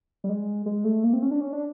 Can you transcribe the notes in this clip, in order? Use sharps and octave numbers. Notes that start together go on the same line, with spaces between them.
G3
G#3
G#3
A3
A#3
C4
C#4
D4
C#4
D4